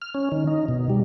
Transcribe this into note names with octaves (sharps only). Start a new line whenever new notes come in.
F6
C#4
D#3
D#4
B2
G3